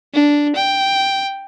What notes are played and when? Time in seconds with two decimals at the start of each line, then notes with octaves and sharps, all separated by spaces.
0.14 D4
0.56 G5